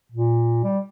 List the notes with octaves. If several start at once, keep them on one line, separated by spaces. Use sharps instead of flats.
A#2
G3